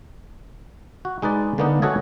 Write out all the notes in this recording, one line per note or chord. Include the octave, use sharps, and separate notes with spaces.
F#4
G#3 D#4 B4 D5
D3 A#3 B3 D4 D#4
F#4 A4 C#5 D#5 E5 G#5